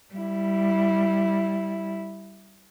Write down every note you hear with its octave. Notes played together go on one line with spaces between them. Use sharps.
G3 E4